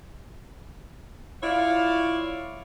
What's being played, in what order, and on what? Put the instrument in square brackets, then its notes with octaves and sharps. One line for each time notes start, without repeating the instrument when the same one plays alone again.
[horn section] E4 F4 C#5 D5 F5